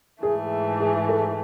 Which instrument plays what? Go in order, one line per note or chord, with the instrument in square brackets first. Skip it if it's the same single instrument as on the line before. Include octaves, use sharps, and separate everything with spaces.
[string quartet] G#2 E3 A3 [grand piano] G#4
[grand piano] G#4
A4